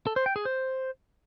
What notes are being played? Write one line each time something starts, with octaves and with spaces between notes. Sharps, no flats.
A4
C5
G5
G#4
C5